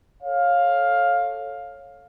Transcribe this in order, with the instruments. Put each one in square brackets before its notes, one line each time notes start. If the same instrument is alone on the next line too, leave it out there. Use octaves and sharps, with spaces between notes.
[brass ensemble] A4 C#5 F5